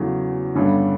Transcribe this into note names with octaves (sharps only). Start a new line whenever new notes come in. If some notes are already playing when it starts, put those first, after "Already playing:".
Already playing: E2 C#3 F#3 A3
G1 G2 D3 G3 C#4